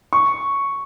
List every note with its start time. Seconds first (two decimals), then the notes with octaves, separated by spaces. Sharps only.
0.13 C#6